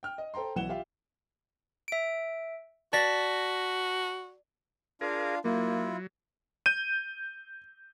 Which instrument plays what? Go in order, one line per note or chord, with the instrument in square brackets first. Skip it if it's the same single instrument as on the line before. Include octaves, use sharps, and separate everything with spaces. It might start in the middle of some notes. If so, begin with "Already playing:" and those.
[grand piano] G5 F6
D#5
A4 C5 G5 A#5 C6
B1 E3 F#5 E7 G7
F4 G4 E5 F5
[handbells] E5 D7
[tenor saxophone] F#4 [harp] D5 [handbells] A5 A#6 B6
[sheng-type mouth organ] D4 F4 F5 [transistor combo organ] G#4 A#4
[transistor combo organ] F#3 [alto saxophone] A#3 [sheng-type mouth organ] E4 F4
[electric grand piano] G6 D#7